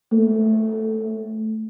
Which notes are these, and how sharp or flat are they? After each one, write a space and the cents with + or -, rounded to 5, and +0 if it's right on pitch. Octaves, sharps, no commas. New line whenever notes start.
A3 -5